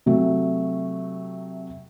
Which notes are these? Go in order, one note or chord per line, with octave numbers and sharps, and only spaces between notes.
C3 F#3 A3